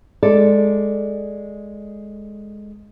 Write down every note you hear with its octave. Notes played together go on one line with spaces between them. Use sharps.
G#3 A4 D5